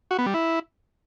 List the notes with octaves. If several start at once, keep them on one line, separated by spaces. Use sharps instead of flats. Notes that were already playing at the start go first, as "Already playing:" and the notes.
F#4
B3
G3
E4